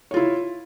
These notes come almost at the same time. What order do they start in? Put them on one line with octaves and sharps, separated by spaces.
C#5 F4 E4